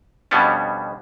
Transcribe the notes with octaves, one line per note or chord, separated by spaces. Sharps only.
F2 B2 G3 B3 C#4 D4